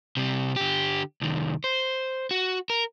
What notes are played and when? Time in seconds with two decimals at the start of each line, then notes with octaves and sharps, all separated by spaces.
0.17 C3 G3
0.56 D3 G4
1.21 C2 D#3
1.64 C5
2.31 F#4
2.70 A#4